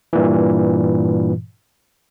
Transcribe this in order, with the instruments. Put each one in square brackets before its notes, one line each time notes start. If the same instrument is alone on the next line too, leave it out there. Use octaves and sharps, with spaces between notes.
[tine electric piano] G2 A#2 E3